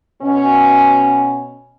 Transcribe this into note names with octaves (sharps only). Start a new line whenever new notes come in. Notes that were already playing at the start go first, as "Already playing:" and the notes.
B2 C#4